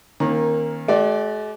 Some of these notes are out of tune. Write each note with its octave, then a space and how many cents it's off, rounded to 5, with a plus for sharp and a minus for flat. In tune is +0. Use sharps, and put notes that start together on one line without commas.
D#3 +0 A#3 +10 C#4 -40
G#3 +45 G4 -45 D5 +0